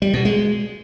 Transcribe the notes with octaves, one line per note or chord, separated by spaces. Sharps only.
G3
B2
G#3